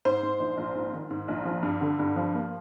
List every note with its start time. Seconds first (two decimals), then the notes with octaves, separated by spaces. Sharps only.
0.05 G#2 C5
0.23 G#2
0.40 A#1
0.57 A#1
0.75 G#2
0.93 D#3
1.10 G#2
1.28 A#1
1.45 F3
1.63 G2
1.81 D3
1.99 G2
2.16 F3
2.34 A#3